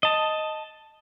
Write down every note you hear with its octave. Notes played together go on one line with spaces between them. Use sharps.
D#5 A5